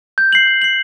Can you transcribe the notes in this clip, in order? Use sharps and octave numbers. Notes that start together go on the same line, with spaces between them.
G6
C7 F#7
G6
C7 F#7